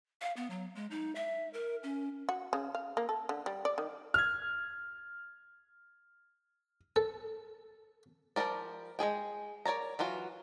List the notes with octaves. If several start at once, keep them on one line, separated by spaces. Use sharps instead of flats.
F5
B3
F#3
G#3
D#4
E5
A#4
C#4
F#4
C#3
F5
A#3
A4
D3
G3
D5
D#3
F6 G#6
A4
F3 G3 C#4 A#4 D5
G#3 D#4 G#4 G5
A#4 C#5 D5 A#5
E3 F#3 F4 F#4